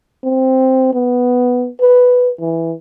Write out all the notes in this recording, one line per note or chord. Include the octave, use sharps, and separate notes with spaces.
C4
B3
B4
E3